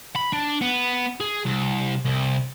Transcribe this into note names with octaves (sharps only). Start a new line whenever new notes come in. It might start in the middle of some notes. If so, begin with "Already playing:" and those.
B5
D4
B3
G#4
C2
C2